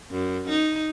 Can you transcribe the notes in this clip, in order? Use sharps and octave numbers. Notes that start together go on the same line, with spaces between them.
F#2
D#4